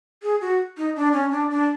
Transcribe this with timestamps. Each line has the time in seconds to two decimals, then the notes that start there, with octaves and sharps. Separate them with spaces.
0.23 G#4
0.41 F#4
0.77 D#4
0.96 D4
1.13 C#4
1.31 D4
1.50 D4